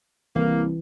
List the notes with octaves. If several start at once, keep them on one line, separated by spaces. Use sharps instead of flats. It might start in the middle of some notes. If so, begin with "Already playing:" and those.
C2 E3 A#3